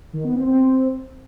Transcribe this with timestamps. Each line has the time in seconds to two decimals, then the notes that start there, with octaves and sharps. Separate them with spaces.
0.13 D#3
0.24 B3
0.36 C4
0.47 C4